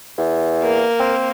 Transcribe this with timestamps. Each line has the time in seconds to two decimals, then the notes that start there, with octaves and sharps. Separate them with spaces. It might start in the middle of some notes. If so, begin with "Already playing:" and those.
0.18 E2
0.62 A#3 A#4
0.99 C4